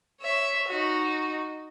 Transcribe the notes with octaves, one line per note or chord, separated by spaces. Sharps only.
C#5 E5
D#4 F#4